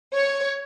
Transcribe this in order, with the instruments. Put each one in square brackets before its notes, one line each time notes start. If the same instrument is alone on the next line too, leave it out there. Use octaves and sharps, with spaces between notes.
[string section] C#5